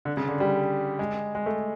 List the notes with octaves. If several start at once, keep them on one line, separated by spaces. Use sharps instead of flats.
D3
C#3
D3
G3
G#3
G#3
A3